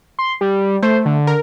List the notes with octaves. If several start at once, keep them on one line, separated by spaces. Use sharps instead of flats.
C6
G3
A3 C5
D3
A#4